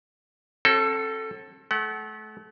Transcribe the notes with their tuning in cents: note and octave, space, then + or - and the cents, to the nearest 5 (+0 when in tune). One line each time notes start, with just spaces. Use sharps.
C4 +45 F#4 +35 A4 +0
A3 -30 F#5 +25